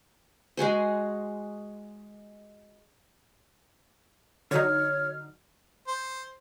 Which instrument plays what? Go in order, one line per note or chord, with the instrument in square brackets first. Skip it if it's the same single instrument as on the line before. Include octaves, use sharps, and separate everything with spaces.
[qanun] G#3 F#4 G#4 C5
[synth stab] D3 F#3 D#4 [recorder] C#5 [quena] F6
[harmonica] C5